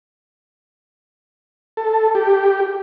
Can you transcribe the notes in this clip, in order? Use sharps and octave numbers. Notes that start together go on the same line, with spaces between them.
A4
G4